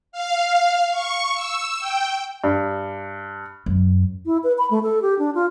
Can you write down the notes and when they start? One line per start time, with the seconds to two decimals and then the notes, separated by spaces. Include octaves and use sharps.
0.12 F5
0.92 C#6
1.35 E6
1.80 G5
2.44 G2
3.66 F#2
4.26 E4
4.44 B4
4.58 B5
4.70 A3
4.83 A4
5.02 G4
5.19 D4
5.35 F4